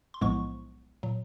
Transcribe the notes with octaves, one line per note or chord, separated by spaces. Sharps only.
C6
B1 A2 F3 G#3 B3 C#6
A#2 F#3